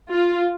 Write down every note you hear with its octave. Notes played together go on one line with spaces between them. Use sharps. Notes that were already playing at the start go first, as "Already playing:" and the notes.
F4